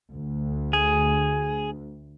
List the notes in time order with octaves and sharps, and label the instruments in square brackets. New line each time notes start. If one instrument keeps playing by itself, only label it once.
[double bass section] D2
[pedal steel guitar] G#4